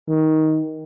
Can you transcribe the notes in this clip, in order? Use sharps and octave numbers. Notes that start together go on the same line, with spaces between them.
D#3